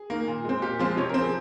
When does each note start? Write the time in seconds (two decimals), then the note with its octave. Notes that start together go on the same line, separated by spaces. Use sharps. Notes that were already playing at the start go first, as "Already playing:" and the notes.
Already playing: G#4
0.10 D#3 A#3
0.28 A#2
0.45 G#3 C4
0.62 A#2 G4
0.79 F3 G#3 C4 F4
0.97 C3 C#5
1.09 A#4
1.14 F3 C4
1.21 G#4